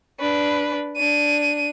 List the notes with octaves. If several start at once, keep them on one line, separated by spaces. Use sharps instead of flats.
D4 B4
D4 D#7